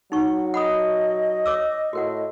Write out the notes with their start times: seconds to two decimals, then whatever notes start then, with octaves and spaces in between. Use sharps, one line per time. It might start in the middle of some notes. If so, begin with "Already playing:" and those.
0.12 F#3 D#4 F#5 C#6
0.54 D#5 F#5 B5 D#6
1.46 C#5 D6 E6
1.93 A2 F#4 A#4 F#5